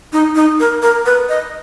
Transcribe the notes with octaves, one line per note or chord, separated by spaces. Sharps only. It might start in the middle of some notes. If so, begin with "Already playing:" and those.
D#4
D#4
A#4
A#4
B4
D#5